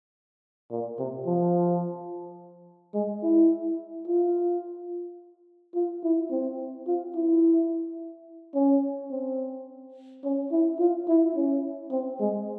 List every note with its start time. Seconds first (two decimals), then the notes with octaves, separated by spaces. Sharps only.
0.71 A#2
0.99 C3
1.26 F3
2.94 G#3
3.23 E4
4.08 F4
5.75 F4
6.04 E4
6.31 C4
6.87 F4
7.15 E4
8.55 C#4
9.11 C4
10.24 C#4
10.52 E4
10.79 F4
11.08 E4
11.36 C#4
11.92 C4
12.20 G#3